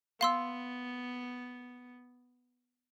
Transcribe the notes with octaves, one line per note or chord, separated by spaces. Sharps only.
B3 F5 C6 E6